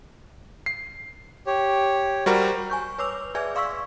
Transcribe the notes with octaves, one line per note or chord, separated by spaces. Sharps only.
C7
G4 C#5
G3 F#4 A#4 C5
G#5 C#6 G6
B4 C#5 D6 E6 F7
G#4 B4 D5 E5 G#5 G#6
D5 F5 C6 C#6 E6 B6